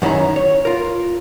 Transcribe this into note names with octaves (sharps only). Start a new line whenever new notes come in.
F#2 D#3 C#4 E4 A#5
C#5
F4 A#4